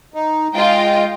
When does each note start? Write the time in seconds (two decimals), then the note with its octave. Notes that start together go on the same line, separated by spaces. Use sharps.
0.14 D#4
0.55 G#3 F4 D#5 G5